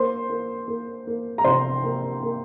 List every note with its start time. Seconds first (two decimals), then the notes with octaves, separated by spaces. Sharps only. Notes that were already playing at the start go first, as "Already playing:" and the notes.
Already playing: A#3 C5 C6
0.29 A#3
0.68 A#3
1.07 A#3
1.38 A#5
1.44 C3 C5 C6
1.83 A#3
2.23 A#3